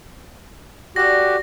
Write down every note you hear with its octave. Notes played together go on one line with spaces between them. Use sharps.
D4 F#4 G4 A4 A#6